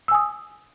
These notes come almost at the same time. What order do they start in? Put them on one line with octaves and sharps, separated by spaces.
E6 G#5 D#6